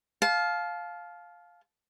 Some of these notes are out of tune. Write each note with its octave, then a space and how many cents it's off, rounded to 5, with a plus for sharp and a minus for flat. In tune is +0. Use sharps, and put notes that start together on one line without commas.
F5 +10 A5 -30